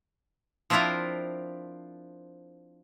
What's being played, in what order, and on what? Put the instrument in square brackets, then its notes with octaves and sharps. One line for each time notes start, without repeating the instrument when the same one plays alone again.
[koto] F3 C4 D4 E4 F4 A#4